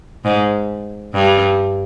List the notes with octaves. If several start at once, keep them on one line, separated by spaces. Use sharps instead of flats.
G#2
G2